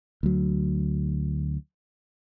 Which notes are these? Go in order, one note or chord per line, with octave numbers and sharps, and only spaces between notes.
D2 F#3